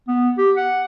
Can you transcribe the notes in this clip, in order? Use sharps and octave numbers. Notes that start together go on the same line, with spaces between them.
B3
G4
F#5